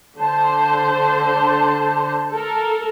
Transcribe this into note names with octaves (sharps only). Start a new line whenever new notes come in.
D3 C5 A5
A4 A#4